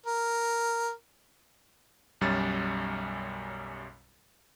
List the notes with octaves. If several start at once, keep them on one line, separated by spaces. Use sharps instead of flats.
A#4
B1 F#2 G3 C#4 A6